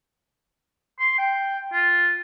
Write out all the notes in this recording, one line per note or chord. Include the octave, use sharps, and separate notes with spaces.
C6
G5
F4